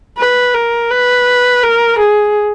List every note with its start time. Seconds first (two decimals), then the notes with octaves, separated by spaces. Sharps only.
0.18 B4
0.55 A#4
0.91 B4
1.63 A#4
1.99 G#4